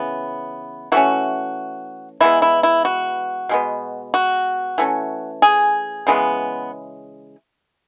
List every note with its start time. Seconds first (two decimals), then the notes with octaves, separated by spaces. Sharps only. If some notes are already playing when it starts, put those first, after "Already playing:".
Already playing: C#3 E3 B3
0.92 E3 A3 C#4 F#4
2.20 E3 G#3 B3 E4
2.42 E4
2.63 E4
2.85 F#4
3.49 B2 G#3 B3
4.14 F#4
4.78 E3 A3 C#4
5.42 G#4
6.07 C#3 E3 G#3 B3